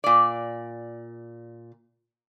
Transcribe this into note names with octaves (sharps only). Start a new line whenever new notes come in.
A#2 D5